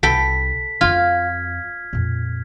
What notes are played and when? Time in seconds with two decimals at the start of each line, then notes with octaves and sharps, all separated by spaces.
0.03 C2 A4 G5 B5 B6
0.81 F2 C4 F4 F6 G#6
1.93 F2 A#2